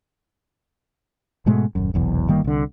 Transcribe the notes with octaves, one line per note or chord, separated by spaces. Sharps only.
G#2 B2 G#3 A3
D#1 F#2
F1 B1 E2
G1 D#3 G3 A#3
C2 D3